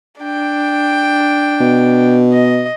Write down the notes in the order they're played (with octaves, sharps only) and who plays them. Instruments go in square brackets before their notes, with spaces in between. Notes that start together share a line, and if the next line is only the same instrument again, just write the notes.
[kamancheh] D4 G5
[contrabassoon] B2
[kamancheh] D#5